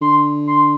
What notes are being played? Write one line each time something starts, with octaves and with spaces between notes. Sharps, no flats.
D3 C6
C6